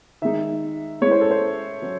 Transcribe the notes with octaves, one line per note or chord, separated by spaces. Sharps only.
D#3 G#3 D#4 E5
G#3 C#4 E4 C#5
C5
A4
C5
F#3 C#4